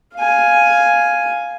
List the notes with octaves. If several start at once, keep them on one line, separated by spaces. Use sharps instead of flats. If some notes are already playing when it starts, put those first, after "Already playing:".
F5 G#5